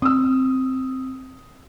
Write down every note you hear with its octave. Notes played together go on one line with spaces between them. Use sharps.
C4 D#6 E6